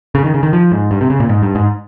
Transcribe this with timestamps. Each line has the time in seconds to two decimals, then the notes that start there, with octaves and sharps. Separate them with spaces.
0.15 C#3
0.24 D#3
0.34 C#3
0.43 D#3
0.53 F3
0.72 G#2
0.91 G2
1.01 C3
1.10 C#3
1.20 A#2
1.29 G#2
1.42 G2
1.55 G#2